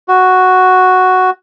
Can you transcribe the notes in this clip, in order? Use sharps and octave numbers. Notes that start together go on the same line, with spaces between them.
F#4